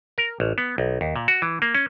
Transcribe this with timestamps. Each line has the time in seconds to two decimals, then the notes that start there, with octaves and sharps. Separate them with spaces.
0.18 A#4
0.40 A1
0.58 B3
0.78 B1
1.01 D#2
1.16 A#2
1.28 F#4
1.42 E3
1.62 A#3
1.75 C#4